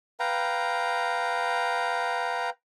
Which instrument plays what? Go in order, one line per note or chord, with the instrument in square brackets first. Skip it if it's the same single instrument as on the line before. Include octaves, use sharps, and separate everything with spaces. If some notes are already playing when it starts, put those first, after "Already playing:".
[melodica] B4 F5 G5 A#5